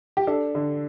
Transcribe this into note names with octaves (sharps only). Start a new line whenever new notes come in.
G4
D4 A4
D3